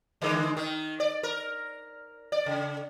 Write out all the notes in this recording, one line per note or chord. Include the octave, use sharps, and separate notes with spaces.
D3 E3 G#3
D#3
D5
A#4
D5
C#3